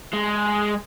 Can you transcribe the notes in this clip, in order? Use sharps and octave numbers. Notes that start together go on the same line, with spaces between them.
G#3